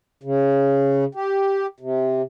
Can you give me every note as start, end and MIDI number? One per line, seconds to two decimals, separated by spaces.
0.23 1.04 49
1.15 1.66 67
1.80 2.22 48